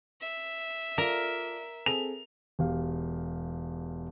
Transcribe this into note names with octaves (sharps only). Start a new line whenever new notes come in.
E5
F4 A4 A#4 D5
C4 G#4 A4 F7
E1 G4 F5